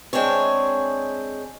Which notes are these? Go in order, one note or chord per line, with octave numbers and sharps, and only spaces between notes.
G#3 C4 D4 G#4 C#5